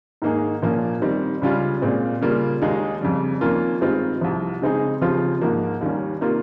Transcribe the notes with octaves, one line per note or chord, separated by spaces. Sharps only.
G#2 D#3 A#3 D#4 G#4
A#2 F3 A#3 C#4
D#3 G3 C4
C#2 C#3 G3 C#4 F4
A#2 G#3 C4
C#3 G3 A#3 F4
D#2 D#3 G#3 D#4 G#4
F2 C#3 G3
F2 D#3 A#3 C#4 F4
G2 D#3 G#3 C4 F4
C2 C3 F3
C#3 G#3 C4 D#4 G#4
D#2 C#3 F3 C4 F4
G#2 F3 A#3
D#2 D#3 G3 C#4
C3 D#3 A#3 F4